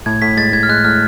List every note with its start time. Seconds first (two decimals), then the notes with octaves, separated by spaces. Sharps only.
0.06 A2 G#6
0.22 A2 B6
0.37 G#3 A6
0.53 A2 G#6
0.63 F6
0.69 G#3 F#6
0.84 A2 F6